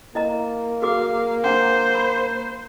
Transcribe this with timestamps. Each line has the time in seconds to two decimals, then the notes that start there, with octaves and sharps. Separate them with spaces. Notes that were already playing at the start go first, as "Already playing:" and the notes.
0.15 A#3 E4 D#5 A#5
0.82 F#4 G#4 F5 D6
1.44 D4 C5 F#5
1.95 B5